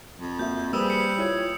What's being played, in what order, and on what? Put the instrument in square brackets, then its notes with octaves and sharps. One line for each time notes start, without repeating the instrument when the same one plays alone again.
[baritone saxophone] F2
[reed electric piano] A#3 F#4 E5 [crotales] G6
[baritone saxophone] G3 [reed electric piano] A#3 [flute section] G#4 B4 C5 [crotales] D#6 E6
[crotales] C#7
[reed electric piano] E4 F4 [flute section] C#5